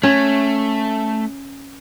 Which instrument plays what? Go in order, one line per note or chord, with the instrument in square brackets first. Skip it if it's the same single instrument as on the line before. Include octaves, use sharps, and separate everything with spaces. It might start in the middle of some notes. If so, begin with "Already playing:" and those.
[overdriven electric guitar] A3 [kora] C#4